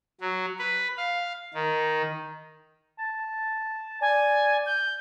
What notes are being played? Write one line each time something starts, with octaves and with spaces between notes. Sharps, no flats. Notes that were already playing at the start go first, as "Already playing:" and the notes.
F#3
B4
F5
D#3
A5
D5 G#5
G6